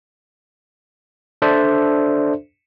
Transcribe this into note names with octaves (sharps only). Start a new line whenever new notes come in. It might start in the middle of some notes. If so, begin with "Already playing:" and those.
D4 A4 C5 D5 E5